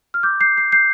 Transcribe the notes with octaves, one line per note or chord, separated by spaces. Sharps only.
F6
D6 G6
G6 C7
C7
G6 C7